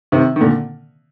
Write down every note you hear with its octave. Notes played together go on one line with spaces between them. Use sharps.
C3 D#3
D#3
A#2 D3